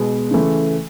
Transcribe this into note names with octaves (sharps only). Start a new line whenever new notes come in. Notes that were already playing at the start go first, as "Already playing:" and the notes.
Already playing: B2 G#3 B3
C#3 E3 A3